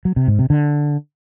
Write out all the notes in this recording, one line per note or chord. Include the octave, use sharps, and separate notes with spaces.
F#3
C3
G#2
C3
D3